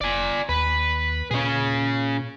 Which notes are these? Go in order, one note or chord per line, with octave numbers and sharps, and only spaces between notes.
F1 D5 G#5
D#2 B4
A#2 C#4 G#4